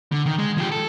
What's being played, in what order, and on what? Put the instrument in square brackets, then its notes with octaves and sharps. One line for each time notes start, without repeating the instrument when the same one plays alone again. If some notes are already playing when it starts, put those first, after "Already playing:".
[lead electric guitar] D3
D#3
G#3
F3 G4
A4